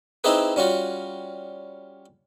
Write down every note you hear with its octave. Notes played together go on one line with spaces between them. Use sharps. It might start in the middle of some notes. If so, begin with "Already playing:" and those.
C4 D#4 E4 G4 G#4 B4
G3 C#4 F4 F#4